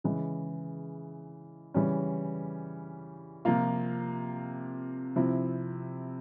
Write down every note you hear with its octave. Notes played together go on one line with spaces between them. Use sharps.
C#3 E3 G#3
C#3 E3 G3 C#4
C3 F3 A#3 F4
C3 F3 C4 E4